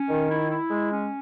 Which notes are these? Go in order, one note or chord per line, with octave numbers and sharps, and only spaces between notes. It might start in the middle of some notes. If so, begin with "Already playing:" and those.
Already playing: C#4
D#3
E4
E4
G#3
C#4